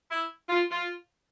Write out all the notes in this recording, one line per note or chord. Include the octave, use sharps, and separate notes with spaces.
E4
F4
F4